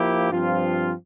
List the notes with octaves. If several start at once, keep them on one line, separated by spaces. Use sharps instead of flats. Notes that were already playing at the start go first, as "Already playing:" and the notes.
Already playing: F3 A#3 E4 G4
G2 F3 C4 F4